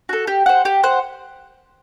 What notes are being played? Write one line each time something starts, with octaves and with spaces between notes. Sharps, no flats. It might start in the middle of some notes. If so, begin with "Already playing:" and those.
F#4 A4
G4
C5 F#5
G4
C5 F#5